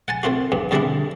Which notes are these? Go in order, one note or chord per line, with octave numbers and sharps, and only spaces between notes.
F#5 G#5 A5
A3 C4 F4 F#4
E2 G2
F2 D3 G3 G#3 D4 E4